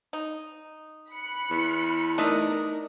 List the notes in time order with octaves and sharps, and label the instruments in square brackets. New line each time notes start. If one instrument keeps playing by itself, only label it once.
[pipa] D#4
[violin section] B5 F#6 C#7
[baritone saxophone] E2
[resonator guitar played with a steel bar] A3 D#4 D#5 [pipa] D4 [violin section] A#4